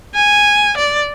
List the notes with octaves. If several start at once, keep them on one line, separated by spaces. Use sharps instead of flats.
G#5
D5